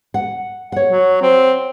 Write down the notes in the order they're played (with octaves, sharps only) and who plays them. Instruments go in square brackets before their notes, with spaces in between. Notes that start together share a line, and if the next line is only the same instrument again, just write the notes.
[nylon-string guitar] F#5
C#5 F#5
[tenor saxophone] F#3
C4